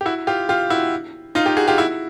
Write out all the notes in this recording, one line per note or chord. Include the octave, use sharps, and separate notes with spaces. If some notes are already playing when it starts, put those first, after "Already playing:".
G4
E4 F#4
F4 G4
F4 G4
E4 F#4
D#4 F4
F4 G4
F#4 G#4
F4 G4
E4 F#4